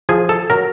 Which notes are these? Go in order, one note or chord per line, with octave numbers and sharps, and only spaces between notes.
F3 G#4 G#5
A4 A5
F#3 A#4 A#5